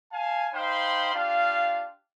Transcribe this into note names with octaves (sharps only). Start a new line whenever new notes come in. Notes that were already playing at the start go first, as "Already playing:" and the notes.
F5 G#5 A5
D#4 C5 F5 G5 B5 C6
D4 F4 G4 F5